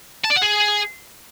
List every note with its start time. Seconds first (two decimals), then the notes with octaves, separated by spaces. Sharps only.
0.25 A5
0.31 D5
0.37 F#5
0.43 G#4